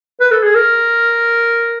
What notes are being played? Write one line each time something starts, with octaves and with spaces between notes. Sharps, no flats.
B4
A4
G#4
A#4